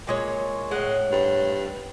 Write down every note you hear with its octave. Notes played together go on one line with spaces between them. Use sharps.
A#2 G#3 C#5
A2 G#3 F#5
G2